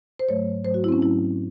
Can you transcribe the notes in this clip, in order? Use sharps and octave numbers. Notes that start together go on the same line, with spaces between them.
C5
G#2 F#3 A3 C#5
G#2 F#3 A3 C5
F#4
E4
C4
C#4
G#2 F#3 A3 E4